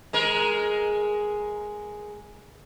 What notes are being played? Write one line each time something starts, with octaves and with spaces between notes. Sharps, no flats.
G#3 A#4